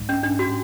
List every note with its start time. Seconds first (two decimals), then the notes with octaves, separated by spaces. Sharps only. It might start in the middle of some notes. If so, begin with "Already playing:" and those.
Already playing: G#2
0.09 C#4
0.23 D4
0.39 F#4